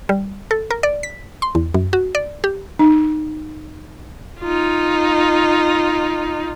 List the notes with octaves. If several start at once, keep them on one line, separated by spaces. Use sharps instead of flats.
G3
A4
A#4
D5
B6
C6
E2
F#2
F#4
D5
G4
D#4
D#4 F4